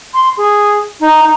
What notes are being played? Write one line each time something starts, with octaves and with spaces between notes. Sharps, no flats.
C6
G#4
D#4
D#4